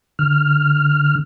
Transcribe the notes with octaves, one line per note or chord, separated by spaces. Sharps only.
D3 F6